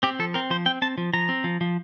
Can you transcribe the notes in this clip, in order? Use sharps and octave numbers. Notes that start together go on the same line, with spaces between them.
C4 G4
F3 A4
C4 A#4
F3 C5
C4 G5
C4 A5
F3
F3 A#5
C4
F3
F3